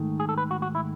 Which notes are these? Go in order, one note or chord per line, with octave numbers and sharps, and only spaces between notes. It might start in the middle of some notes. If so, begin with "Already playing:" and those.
Already playing: G#2 D#3 A3
G#4
A4
B4
F#4
F#4
E4